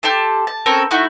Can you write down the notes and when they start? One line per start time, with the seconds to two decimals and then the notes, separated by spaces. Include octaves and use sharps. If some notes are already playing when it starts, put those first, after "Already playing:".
0.03 G4 A4 A5 C6
0.47 A5
0.66 C4 C#4 A4 A#4
0.91 A3 D#4 E4 F#4